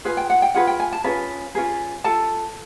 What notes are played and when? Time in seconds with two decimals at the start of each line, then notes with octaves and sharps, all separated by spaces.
0.05 F4 G#4 B4 G#5
0.17 G5
0.30 F#5
0.42 G5
0.55 F4 G#4 B4 F#5
0.67 G5
0.80 G#5
0.92 A5
1.04 C#4 F4 G#4 B4
1.55 C#4 F4 G#4 B4
2.04 F4 A4 A5